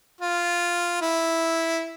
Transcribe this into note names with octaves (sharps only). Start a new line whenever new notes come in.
F4
E4